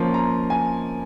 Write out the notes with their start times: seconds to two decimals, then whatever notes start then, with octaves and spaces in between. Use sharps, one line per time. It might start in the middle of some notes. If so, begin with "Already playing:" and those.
Already playing: F3 A#3 C#4 C6
0.14 A#5
0.50 G#5